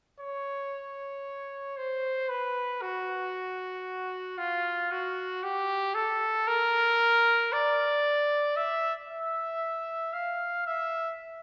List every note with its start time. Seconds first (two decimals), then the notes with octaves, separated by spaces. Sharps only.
0.20 C#5
1.77 C5
2.29 B4
2.82 F#4
4.38 F4
4.91 F#4
5.43 G4
5.95 A4
6.47 A#4
7.53 D5
8.56 E5
9.09 E5
10.13 F5
10.66 E5